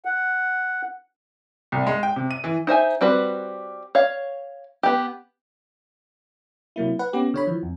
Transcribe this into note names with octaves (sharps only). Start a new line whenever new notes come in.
F#5
C2
G#3
G5
C3
D#7
E3
D#4 C5 E5 G#5
G3 C4 F#4 B4
C#5 F5
B3 G4
C3 F#3 A#3 E4
B4 F#5
B3 C#4 G4
D3 C#5 B5
E3 F3
F2